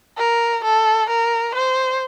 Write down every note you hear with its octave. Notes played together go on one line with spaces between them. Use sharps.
A#4
A4
A#4
C5